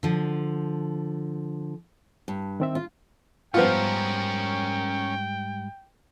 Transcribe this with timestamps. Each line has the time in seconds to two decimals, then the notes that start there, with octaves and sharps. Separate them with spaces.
0.03 D3 F3
2.28 G2
2.60 D#3 C4 E5
2.75 F4
3.54 G#2 F3 G3 B3 C#4 F4 A#4 G5